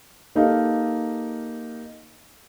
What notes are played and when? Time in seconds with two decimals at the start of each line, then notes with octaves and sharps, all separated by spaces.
0.35 A#3 D#4 G4 A4 F5